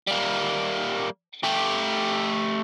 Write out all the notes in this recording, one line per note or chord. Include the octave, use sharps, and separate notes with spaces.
G3 A#3
A3 G4